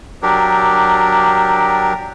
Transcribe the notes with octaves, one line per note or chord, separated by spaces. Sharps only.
F#3 D4 G4 A#4